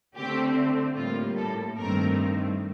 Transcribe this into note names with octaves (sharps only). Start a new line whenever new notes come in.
D3 A3 C4 G4
A2 G3 A#3 F4
A4
G2 D#3 A3 C4 A#4